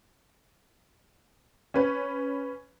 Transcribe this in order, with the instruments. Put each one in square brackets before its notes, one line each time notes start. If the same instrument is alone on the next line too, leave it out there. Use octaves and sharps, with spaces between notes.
[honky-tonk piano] C#4 B4